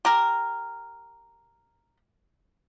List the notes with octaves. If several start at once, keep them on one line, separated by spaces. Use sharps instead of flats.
G4 A#4